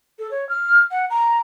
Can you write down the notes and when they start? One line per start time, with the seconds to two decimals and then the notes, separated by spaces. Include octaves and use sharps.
0.19 A4
0.31 C#5
0.49 F6
0.91 F#5
1.10 A#5